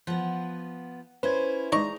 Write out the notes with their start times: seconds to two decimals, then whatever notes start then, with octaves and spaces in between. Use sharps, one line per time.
0.07 F3 B3 F#5
1.23 C#4 E4 B4 C5 G#6
1.72 G#3 D4 D#4 D#5 A#5 C#6